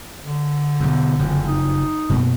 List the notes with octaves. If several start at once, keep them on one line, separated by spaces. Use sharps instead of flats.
D3
B1 E2
F#1 F2
D#4
F#2 B2 A#3